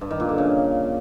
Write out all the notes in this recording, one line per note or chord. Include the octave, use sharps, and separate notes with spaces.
G2
D#3
A#2
D3
C#3